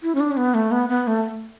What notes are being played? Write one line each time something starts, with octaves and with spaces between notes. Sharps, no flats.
E4
C#4
D4
C#4
B3
A3
B3
B3
A3